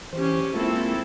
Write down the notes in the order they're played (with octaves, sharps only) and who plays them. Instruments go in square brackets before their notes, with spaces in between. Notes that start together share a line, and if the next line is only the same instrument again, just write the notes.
[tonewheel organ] E3 C5 [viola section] C#4 G4
[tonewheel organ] G#3 A#3 F4 [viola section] C4 E4 A4